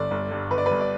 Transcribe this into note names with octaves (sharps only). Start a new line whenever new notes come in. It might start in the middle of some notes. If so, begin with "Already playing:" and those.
Already playing: G1 D3 D5
G1
G2
G1 B4
D5
B4
G1
D5